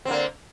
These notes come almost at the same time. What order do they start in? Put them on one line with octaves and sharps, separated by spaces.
C4 D3 A#3